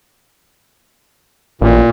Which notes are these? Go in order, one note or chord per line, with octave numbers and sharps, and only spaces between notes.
A1 A#2